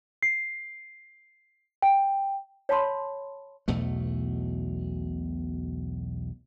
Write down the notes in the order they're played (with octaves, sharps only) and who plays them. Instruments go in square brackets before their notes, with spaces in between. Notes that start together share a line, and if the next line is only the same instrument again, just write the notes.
[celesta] C7
G5
[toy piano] C#5 F5 A5 B5 C6
[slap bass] B1 E2 B2 A3